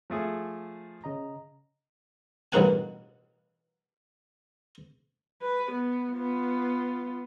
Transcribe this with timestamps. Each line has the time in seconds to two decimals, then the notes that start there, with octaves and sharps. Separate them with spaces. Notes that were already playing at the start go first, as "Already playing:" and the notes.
0.10 F3 A3 G#4
1.04 C#3 D#5 A#5
2.52 A1 G2 B2 A#3 F#5 G#5
5.42 B4
5.71 B3
6.13 B3 F4